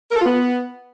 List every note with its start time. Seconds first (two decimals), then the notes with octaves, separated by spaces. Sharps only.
0.10 A#4
0.15 A4
0.21 F4
0.26 B3